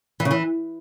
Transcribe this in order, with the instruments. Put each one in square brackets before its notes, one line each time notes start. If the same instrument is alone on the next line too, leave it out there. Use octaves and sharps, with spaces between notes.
[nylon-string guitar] E3
C#3
E3